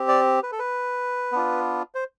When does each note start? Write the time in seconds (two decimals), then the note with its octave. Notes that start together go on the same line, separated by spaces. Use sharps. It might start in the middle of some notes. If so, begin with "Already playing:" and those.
Already playing: C4 G4
0.08 D5
0.43 B4
0.52 A4
0.59 B4
1.32 B3 D4 F4
1.95 C5